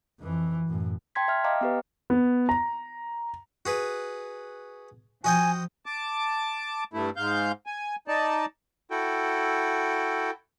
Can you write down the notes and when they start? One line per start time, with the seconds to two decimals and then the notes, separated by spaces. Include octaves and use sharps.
0.20 F2 E3
0.66 F#2 A2
1.15 G5 A5 C6 G#6 B6
1.28 E5 F6
1.44 D#5 F5 G5 A#5 D6 F6
1.61 B3 G4 B4
2.10 B3
2.49 A#5
3.66 F#4 G#4 B4
5.24 F3 F#4 D#5 G5 G#5
5.86 A5 D6
6.94 G2 A3 E4
7.17 G#2 F5 G6
7.66 G#5
8.08 D#4 D5 A5
8.91 E4 F#4 A4 G5